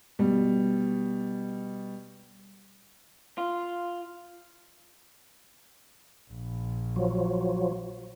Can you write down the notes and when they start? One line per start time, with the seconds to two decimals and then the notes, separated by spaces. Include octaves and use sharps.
0.19 B2 G3
3.38 F4
6.31 A#1
6.96 F3 F#3